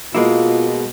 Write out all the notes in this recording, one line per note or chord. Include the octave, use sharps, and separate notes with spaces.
B2 G#3 A#3 E4 F4